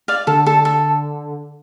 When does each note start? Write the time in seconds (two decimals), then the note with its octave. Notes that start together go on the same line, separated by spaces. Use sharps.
0.08 D5 F5
0.27 D3 A4
0.46 A4
0.65 A4